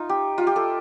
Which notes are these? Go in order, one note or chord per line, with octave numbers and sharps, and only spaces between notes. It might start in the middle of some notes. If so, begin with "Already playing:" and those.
Already playing: D#4 F4
G4
F4
G4
A4